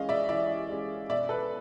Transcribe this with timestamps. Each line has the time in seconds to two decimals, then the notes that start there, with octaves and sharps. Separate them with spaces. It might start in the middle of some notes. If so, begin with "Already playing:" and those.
Already playing: E3 G#3 C#4 D#5 F5
0.09 D5 E5
0.28 E3 D5 E5
0.70 G#3 C#4
1.09 B2 D5 E5
1.29 A4 B4